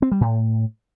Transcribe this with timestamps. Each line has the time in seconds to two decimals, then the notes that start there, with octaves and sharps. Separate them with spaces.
0.02 C4
0.12 G3
0.21 A2